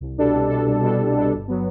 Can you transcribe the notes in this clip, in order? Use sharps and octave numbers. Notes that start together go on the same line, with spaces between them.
C2
B2 G3 D4 A4
C2
B2 G3 D4 A4
C2
B2 G3 D4 A4
C2
B2 G3 D4 A4
G1
F#3 B3